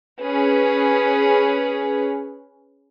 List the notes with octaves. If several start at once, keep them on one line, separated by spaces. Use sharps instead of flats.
C#4 G#4 B4